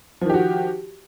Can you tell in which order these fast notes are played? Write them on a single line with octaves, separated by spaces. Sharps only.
F3 D#3 G4 F#4